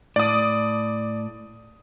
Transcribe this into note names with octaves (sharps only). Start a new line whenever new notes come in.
A2 D5 D#6